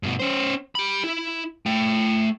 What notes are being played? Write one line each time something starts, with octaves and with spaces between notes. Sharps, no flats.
G2 B2
C#4 C5
G4 B5
E4
A3 G5